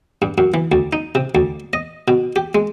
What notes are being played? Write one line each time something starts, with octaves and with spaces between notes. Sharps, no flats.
G2
F#2
E3
D2
D#4
C3
D2
D#5
B2
G4
G#3